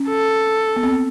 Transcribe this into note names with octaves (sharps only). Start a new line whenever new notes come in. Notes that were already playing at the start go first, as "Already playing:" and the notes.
Already playing: C#4
A4
B3
C4